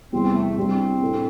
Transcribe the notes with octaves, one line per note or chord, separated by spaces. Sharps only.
E2 C3 G3 C4
A3
C2 C3 G3 C4 D4
A2 A3 D4